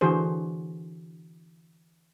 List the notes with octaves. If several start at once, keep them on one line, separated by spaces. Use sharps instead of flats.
D3 E3 F#4 G#4 C5